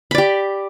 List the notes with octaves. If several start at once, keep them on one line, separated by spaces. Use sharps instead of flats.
G4 D5 B5